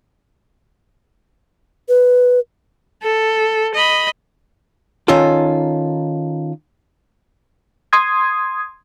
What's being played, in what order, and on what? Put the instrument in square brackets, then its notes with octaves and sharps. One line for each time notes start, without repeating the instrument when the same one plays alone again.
[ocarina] B4
[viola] A4
D#5 B5
[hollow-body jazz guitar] D#3 C#4 D#4 F4 A4
[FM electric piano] C6 D#6 G#6